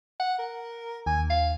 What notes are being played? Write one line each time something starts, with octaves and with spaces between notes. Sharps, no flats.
F#5
A#4
D#2 G#5
F5